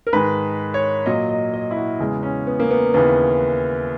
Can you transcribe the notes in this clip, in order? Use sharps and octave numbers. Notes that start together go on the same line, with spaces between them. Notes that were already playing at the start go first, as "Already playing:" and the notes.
A#4
G#2 D#3 G#3 B4
C#5
A#2 F#3 D#5
D#5
D#5
E4
F#4
E2 C#3 G#3
C#4
B3
A#3
B3
D#2 C#3 E3 B3